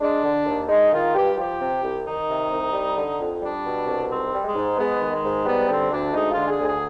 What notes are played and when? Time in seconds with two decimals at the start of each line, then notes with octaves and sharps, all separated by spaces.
0.01 G#3 D4
0.24 D3
0.47 D#2
0.69 G#3 D#4
0.92 D#3 F4
1.14 G2 G4
1.38 F3 G4
1.60 C3
1.83 C2
2.05 D#3 D#4
2.29 C3
2.51 C2
2.73 G3
2.97 D3
3.19 F2
3.41 G3 D4
3.64 B2
3.87 C2
4.09 G#2 C4
4.32 G3
4.44 G#3
4.55 G#2
4.77 G#3 B3
5.00 D#3
5.12 G#3
5.24 G#2
5.46 G3 B3
5.68 D3 C4
5.91 D2 D4
6.14 G#3 D#4
6.31 F4
6.37 D3
6.48 G#4
6.60 D2
6.65 G#4